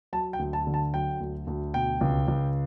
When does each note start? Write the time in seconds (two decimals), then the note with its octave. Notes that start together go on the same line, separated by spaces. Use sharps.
0.13 F#3 A5
0.33 G5
0.39 D2
0.53 A5
0.67 D3
0.74 A5
0.93 F#3 G5
1.20 D2
1.47 D2
1.74 B2 G5
2.01 C#2
2.28 C#2